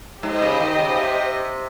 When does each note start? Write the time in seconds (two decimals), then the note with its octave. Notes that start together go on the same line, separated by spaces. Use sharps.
0.23 G#2 G4 C5 D#5
0.42 C#3
0.60 D#3
0.79 C#3
0.97 C3